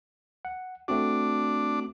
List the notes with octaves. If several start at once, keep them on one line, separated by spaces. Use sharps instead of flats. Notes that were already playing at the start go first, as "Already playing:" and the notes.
F#5
A3 C4 D4 F#4